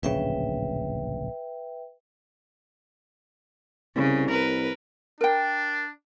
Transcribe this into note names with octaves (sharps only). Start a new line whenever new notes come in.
D1 A#1 C#3 B4 E5 G5
C2 C#3
A#4 B4
D4 A#4 G5